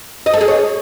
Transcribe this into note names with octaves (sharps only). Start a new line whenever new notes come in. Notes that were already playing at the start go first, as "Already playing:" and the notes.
D#5
A4
G#4
C#5